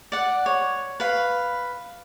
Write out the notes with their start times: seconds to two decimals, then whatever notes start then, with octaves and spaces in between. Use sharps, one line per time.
0.12 D5 F#5
0.46 C#5
1.00 B4 F5